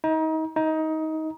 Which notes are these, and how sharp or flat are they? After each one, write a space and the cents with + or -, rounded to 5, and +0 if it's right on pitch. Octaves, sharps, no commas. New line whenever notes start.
D#4 +30
D#4 +20